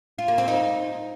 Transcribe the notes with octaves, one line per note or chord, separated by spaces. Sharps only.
F4
A#3
C4
D#4